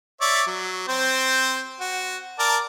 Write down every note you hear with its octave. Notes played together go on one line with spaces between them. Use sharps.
C#5 D5 E5
F#3
C4 C5
F#4
A#4 D5 A5